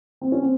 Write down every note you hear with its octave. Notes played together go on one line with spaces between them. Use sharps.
C4
C#4
C4